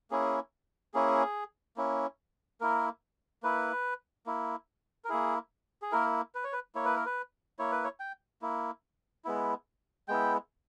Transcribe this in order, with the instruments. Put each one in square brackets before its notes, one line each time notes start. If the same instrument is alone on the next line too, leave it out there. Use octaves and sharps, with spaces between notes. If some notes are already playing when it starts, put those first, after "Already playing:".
[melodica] A#3 C#4 E4 G#4
A#3 C#4 E4 G#4
A#3 C#4 E4
A#3 E4 A#4
A#3 E4 B4
A#3 E4
A#4
A#3 E4 G#4
G#4
A#3 E4 A#4
B4
C#5
B4
A#3 E4 C#5
B4
A#4
B4
A#3 E4 C#5
B4
C#5
G5
A#3 E4
G#3 B3 E4
G#3 B3 E4 G5